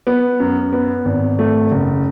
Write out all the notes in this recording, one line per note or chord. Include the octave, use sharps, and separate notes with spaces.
B3
F#2
B3
G#1
A3
F#1